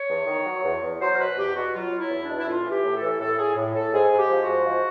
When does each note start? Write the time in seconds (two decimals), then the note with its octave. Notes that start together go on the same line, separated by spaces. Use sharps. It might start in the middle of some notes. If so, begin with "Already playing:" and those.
Already playing: C#5
0.09 E2
0.27 D#3
0.46 F#3
0.64 E2
0.83 E2
1.00 F#3 C5
1.14 A#4
1.18 B2 B4
1.37 E2 G4
1.55 B2 F#4
1.73 F#3 F4
1.92 F#3
1.98 E4
2.11 E2
2.23 D4
2.28 B2
2.38 E4
2.47 A2 F4
2.65 E3
2.71 G4
2.83 A2
2.96 A4
3.02 E3
3.19 A2 A4
3.38 A2 G#4
3.56 A2
3.74 A2 A4
3.93 G#2 G#4
4.12 G#2
4.17 G4
4.30 F3
4.42 F#4
4.47 G#2
4.66 F3